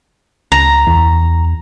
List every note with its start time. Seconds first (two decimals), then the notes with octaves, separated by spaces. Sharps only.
0.52 C#2 A#5
0.87 E2